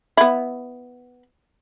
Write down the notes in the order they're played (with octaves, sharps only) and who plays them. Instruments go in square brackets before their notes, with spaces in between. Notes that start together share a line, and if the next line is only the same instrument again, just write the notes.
[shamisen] B3 E4